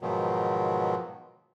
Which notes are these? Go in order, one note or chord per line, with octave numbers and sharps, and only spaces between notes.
G#2 B2 D#3 F3 F#3